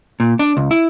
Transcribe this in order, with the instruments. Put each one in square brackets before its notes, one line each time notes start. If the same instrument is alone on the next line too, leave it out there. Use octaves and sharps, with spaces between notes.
[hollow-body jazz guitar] A#2
D4
C#2
E4